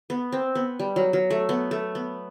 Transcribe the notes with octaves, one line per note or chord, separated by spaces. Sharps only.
B3
C4
B3
G3
F#3
F#3
A3
B3
A3
B3